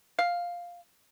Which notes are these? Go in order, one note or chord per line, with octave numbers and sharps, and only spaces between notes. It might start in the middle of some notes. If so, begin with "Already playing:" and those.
F5